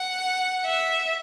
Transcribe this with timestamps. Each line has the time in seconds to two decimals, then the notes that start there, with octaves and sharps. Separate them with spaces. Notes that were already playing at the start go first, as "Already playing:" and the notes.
Already playing: F#5
0.66 E5